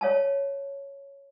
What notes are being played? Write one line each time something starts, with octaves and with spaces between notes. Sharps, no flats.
C#5 F5 A5